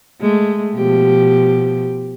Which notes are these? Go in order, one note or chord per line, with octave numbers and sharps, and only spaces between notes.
G#3 A3
B2 F3 G4